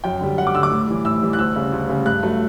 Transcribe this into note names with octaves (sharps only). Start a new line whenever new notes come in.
F#2 G5
D3 G3
F#2 F#5
D6
D3 G3 E6
D6
A2
E3 G3
A2 E6
E3 G3
F#6
D2 E6
C#3 G3
D2
C#3 G3
G2 F#6
F#3 A3